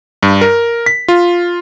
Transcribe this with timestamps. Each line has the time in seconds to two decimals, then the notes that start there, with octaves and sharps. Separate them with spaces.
0.23 G2
0.41 A#4
0.86 B6
1.08 F4